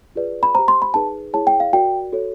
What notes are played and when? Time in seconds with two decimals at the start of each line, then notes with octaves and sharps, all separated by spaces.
0.15 F4 G#4 B4 D5
0.43 B5
0.55 G4 C5 A#5
0.68 C6
0.82 B5
0.94 D#4 G#4 B4 A5
1.33 E4 G#4 C#5 A5
1.47 G5
1.60 F5
1.73 F#4 A#4 D5 G5
2.12 F#4 A4 C#5